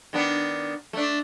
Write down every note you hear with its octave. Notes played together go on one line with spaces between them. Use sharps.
D#3 B3 D4
A3 D4